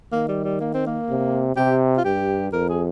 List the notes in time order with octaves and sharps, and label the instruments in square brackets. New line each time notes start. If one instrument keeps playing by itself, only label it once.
[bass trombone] D#3 [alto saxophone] A#3
[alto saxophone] G3
G3
A#3
C4
A#3
[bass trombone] C3
[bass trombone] C3 [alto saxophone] G4
[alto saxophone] F4
[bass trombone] G2 [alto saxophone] G4
[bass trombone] F2 [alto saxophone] A#4
[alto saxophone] G#4